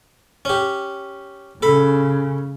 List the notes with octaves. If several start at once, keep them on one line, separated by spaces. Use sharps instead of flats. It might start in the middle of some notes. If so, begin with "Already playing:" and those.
C#4 G4
C#3 A4 B5